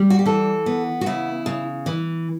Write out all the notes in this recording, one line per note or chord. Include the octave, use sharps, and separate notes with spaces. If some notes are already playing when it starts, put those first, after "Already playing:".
Already playing: G3
F#4
G4
E3 A4
B3
F#4
C#3 E4
C#3
E3